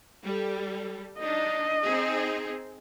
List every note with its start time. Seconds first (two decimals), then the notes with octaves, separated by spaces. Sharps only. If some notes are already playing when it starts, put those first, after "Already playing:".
0.24 G3 A4
1.20 D4 D#4 D#5
1.86 C4 D#4 G#4